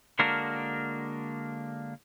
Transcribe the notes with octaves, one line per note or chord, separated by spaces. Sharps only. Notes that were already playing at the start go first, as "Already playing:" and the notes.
D3 G#3 A#3 D4 F#4 A#4